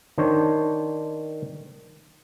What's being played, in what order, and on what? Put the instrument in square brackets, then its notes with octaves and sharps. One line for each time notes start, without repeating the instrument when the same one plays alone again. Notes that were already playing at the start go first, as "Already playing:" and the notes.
[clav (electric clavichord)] D#3 D4 C5 C#5